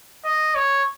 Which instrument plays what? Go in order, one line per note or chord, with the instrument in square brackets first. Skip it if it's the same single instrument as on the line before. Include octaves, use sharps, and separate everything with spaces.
[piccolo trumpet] D#5
C#5